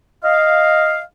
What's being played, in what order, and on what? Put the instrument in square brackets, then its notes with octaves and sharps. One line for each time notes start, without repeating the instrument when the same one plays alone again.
[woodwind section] D#5 F5